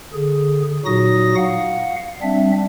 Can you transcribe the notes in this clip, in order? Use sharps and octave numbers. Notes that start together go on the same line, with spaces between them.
D3 G#4
A#2 F#3 D#4 F#4 D#6 A#6
F5 F#5
G3 C4 D4 E5